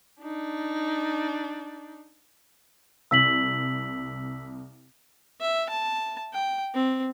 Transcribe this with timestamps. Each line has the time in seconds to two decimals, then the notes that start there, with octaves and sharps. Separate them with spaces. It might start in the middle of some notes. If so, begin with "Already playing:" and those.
0.21 D4 D#4
3.11 C2 E6 B6 F#7
5.41 E5
5.69 A5
6.33 G5
6.74 C4